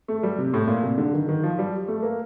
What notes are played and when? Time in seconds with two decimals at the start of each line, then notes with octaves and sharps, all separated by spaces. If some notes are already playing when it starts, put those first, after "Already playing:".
0.08 A3
0.23 G3
0.39 C3
0.54 A2
0.68 A#2
0.83 C3
0.98 D3
1.14 D#3
1.29 D#3
1.43 F3
1.59 G3
1.88 A3
2.03 A#3